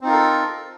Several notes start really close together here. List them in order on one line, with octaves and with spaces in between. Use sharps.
C4 D#4 F4 A#4 A4